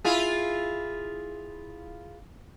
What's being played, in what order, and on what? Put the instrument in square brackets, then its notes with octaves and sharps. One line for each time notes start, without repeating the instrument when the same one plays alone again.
[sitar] E4 F4 G#4